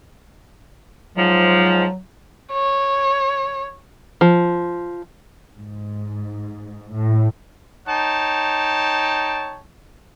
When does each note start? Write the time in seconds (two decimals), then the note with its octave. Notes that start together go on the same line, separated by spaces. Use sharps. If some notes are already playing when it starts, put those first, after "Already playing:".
1.17 G#2 F3 F#3
2.53 C#5
4.21 F3
5.57 G#2
6.95 A2
7.87 D#4 C#5 G5 A5